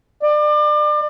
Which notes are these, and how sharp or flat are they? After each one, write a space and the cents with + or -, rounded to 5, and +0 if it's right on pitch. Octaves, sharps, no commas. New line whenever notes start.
D5 +30